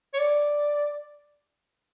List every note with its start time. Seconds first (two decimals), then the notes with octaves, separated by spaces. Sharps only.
0.14 C#5
0.19 D5